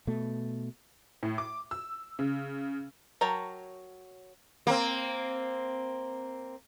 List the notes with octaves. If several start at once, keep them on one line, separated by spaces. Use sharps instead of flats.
B2 A3
A2
D6
E6
C#3
F#3 A#4 C#5 G5 A5
A#3 C4